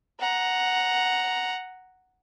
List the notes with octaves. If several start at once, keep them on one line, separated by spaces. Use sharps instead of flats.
F#5 A#5